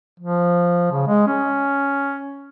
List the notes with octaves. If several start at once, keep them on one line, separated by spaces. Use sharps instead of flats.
F3
C#3
G#3
C#4